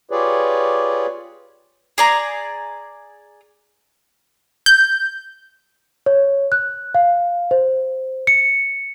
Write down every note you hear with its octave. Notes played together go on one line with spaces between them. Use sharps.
F4 G4 G#4 B4 C#5 D5
G#4 D5 A#5
G6
C#5
F#6
F5
C5
C#7